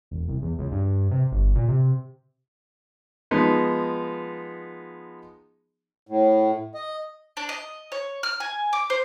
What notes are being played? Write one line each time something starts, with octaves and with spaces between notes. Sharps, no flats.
E1
C2
E2
C#2
G2
C3
G1
A#2
C3
F3 G#3 B3 D#4
A2
D#5
D4
D#5
C#5
F6
G#5
D6
C5